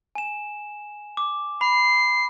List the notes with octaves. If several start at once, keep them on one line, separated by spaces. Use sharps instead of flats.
G#5 E7
D6
B5 C7